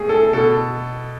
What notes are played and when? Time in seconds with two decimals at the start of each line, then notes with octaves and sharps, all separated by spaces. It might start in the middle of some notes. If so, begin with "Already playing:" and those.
Already playing: A2 G#4
0.09 A4
0.33 B2 A4